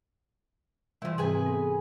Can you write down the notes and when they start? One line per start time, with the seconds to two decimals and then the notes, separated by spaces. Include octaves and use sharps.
1.02 C3 E3 F3 G3 E4
1.18 G#2 C3 C4 G#4 B4 G#5
1.46 B3 A4